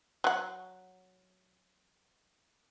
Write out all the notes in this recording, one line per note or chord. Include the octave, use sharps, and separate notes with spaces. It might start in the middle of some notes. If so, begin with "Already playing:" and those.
F#3 F#5